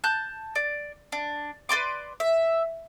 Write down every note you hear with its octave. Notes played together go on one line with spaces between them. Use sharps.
A5 F#6 G6
D5
D4
B4 D5 C6 D6
E5